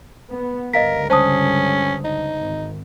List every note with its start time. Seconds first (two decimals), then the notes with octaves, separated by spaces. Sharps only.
0.31 B3
0.73 C#2 G2 D3 A#4 D#5 F5 B6
1.10 C#4 C5 A5 D#6
2.04 D#4
2.39 G#1